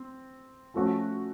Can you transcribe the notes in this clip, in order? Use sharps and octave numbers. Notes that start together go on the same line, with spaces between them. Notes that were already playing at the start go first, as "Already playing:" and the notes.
Already playing: C4
F3 A3 C#4 F#4